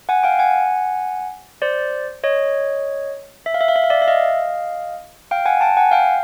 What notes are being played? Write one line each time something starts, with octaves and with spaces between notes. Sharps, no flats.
F#5 G#5
F5 G5
F#5 G#5
C5 D5
C#5 D#5
E5
F5
E5
F5
E5
F5
D5 E5
E5
D#5 F5
F5 G5
F#5 G#5
G5 A5
F#5 G#5
F5 G5